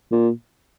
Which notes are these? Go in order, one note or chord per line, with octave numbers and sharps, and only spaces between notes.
A#2